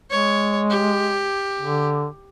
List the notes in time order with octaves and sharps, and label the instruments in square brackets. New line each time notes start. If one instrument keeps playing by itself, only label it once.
[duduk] G#3 [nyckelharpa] C#5
[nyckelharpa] G4
[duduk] D3